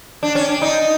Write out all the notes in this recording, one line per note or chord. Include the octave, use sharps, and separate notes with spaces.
D4
C#4
D4
D#4